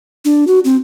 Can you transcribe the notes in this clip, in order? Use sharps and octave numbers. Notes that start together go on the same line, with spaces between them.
D4
F#4
C4